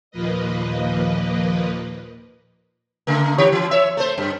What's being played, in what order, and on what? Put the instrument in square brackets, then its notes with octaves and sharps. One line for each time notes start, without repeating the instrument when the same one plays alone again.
[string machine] D#2 A#2 F3 A#3 B4 D#5
[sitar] C#3 A3 A#3
D#3 G4 C#5
E3
C#5 E5
A3 C5
F#2